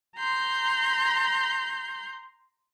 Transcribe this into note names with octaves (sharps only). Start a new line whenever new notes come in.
A#5 C6 G6